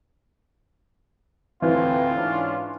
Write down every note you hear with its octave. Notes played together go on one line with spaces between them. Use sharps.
D2 A2 E3 C4 F4 B4
G#2 C#4 D4